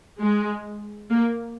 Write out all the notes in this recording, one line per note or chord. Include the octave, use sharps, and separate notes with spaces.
G#3
A#3